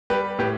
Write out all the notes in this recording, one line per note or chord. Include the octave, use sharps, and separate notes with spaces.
G3 G4 B4
A2 G4 B4